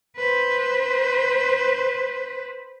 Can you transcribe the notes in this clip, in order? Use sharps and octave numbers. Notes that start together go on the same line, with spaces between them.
B4 C5